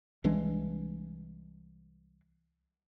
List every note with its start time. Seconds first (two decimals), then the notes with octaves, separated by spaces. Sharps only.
0.24 C2 E3 G#3 D4